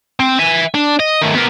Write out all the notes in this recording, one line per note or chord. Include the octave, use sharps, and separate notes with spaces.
C4
E5 G#5
D4
D#5
D#3 A3
B3 A#4